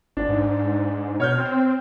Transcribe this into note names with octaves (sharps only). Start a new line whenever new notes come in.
G#1 D4
G#2
B2 C#5 F6 G6
C4